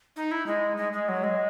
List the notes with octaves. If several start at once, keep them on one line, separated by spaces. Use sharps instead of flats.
D#4
E4
G#3
G#3
G#3
F#3
G#3